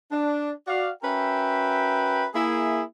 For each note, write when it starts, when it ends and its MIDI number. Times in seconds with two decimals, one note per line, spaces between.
0.11 0.51 62
0.67 0.90 66
0.67 0.90 74
0.67 0.90 77
1.03 2.25 61
1.03 2.25 66
1.03 2.25 70
1.03 2.25 71
1.03 2.25 76
1.03 2.25 79
2.35 2.82 58
2.35 2.82 64
2.35 2.82 68